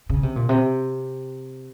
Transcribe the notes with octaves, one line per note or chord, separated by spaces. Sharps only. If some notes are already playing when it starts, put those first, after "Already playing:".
C#3
C3
A#2
C3